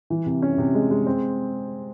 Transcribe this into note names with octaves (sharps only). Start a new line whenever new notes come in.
E3
C3
C#4
C3
G#3
G#3
C4